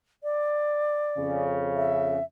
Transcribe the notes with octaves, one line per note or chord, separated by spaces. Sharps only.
D5
F2 C#3
E5